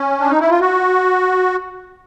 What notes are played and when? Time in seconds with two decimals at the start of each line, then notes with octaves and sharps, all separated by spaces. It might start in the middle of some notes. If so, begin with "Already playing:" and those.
Already playing: C#4
0.20 D4
0.29 D#4
0.40 E4
0.50 F4
0.60 F#4